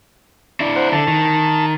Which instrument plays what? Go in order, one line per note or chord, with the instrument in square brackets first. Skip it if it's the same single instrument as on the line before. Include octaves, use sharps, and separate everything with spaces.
[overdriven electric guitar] D4 E4
[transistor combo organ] C5 F#5
[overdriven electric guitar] D3 [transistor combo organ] A5
[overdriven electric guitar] D#3